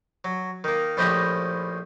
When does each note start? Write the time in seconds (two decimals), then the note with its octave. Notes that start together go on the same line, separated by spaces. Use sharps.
0.24 F#3
0.64 D#3 A#3
0.97 A#1 A2 F3 G4 D#5